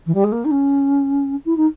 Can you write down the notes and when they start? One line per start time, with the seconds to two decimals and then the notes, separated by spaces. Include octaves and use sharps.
0.06 E3
0.14 G3
0.24 G#3
0.32 A#3
0.44 D#4
0.51 C#4
1.45 E4
1.57 D#4